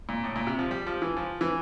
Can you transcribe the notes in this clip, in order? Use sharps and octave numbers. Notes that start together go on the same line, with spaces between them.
A#2
A2
A#2
C3
F3
G3
F3
E3
F3
E3